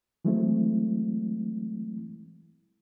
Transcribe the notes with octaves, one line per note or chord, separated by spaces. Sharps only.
E3 F#3 G#3 A3 C4 E4